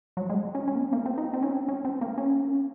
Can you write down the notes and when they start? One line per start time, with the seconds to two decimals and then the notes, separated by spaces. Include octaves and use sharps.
0.17 F#3
0.29 G#3
0.55 C#4
0.68 C#4
0.75 A#3
0.80 C4
0.93 A#3
1.06 C4
1.18 D#4
1.33 C4
1.42 C#4
1.68 C#4
1.85 C4
2.01 A#3
2.18 C#4